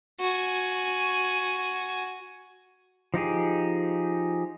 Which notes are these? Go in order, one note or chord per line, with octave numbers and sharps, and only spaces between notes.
F#4 G#5
F3 D#4 G4 G#4